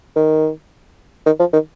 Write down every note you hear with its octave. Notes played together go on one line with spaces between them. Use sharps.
D#3
D#3
F3
D#3